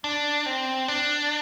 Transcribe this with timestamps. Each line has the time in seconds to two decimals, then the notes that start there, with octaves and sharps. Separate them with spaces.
0.04 D4
0.46 C4
0.88 D4